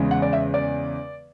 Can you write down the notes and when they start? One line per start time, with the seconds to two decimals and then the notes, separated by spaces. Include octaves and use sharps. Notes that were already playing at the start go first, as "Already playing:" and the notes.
Already playing: E2 C#3 G#3
0.11 F#5
0.22 D5
0.33 E5
0.54 D5